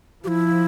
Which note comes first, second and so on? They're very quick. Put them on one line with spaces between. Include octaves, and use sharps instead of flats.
F3 G4 E4